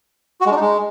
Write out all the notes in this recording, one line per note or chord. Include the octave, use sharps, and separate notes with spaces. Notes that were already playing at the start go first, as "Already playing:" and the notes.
F#4
G#3
D4
D#4
G#3